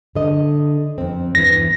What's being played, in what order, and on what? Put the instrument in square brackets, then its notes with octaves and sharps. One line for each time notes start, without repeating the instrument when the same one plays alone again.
[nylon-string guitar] D3 D#5
F2 C4
[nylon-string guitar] E2 G2 E3 [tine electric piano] A#6